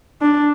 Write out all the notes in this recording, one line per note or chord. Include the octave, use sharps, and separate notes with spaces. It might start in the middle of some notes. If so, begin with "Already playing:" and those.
D4